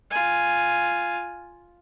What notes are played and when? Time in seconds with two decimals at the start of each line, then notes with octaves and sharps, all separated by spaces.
0.11 F4 G#5